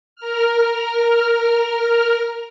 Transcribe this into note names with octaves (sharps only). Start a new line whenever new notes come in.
A#4 F6